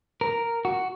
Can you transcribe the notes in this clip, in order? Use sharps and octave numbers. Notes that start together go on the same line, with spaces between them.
A#4
F#4